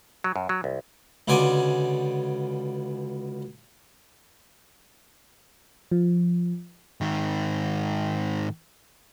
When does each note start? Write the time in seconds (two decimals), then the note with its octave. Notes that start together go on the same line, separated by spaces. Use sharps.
0.24 F#3
0.36 F#2
0.49 F#3
0.64 C2
1.28 C#2 B2 D3 G#5 C6 D6
5.91 F3
7.01 G#2 D#3